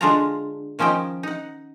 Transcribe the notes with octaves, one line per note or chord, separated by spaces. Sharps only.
D3 G#3 D4 F4 F#4 A#5
D#3 F3 C#4 D#5 G5
D#4 F#5